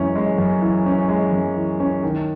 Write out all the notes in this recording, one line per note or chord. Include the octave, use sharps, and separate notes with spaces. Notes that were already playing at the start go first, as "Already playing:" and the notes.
Already playing: F#2 E3 G#3 C#4
G#3
F#2
E3
C#4
G#3
F#2
E3
C#4
D#3